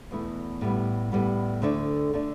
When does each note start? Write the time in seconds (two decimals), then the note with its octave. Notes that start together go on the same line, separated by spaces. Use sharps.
0.11 E2 B2 A3 E4
0.61 A2 G3 B3
1.12 A2 G3 B3
1.62 D2 D3 A3 D4
2.13 D3 A3 D4